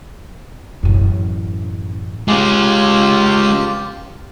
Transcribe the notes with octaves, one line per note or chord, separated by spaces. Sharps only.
A1 F#2
G#3 C#4 F4 G4